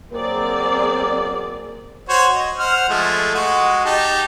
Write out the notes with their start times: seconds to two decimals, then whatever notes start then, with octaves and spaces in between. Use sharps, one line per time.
0.13 F#3 A#3 C4 G#4 A#4 D5
2.09 F#4 C5 C#5
2.34 D#5
2.58 C5 F#5 F6
2.89 F3 G#3 A3
3.35 G#3 F#4
3.85 D#4 G4 A5